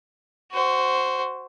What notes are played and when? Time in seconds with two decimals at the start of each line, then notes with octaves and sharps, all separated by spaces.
0.52 F#4 C5